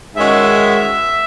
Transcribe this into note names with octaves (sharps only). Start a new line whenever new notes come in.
G#2 D#3 G#3 C#4 F#4 E5